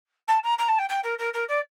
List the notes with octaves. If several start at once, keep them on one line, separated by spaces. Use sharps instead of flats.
A5
A#5
A#5
A5
G5
G5
A#4
A#4
A#4
D5